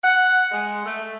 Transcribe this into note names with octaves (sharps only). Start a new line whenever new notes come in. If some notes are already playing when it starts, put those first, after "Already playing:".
F#5
G#3
A3